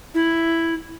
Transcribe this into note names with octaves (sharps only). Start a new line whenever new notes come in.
E4